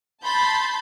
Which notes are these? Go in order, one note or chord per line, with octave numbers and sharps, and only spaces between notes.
A5 B5 C6 G6 A6